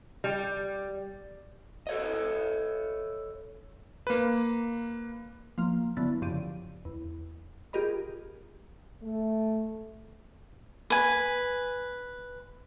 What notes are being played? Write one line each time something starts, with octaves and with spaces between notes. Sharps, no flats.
G3
A4 C#5 D#5
A#3 B4
F3 A#3
D3 F#3 B3 E4 A6
F#2 C#3 F3 G4 D5 D#7
E2
F4 G4 G#4 A#4 D#5 B5
A3
B4 G#5